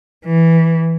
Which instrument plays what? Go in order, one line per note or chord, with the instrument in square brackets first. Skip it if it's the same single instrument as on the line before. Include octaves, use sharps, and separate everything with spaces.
[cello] E3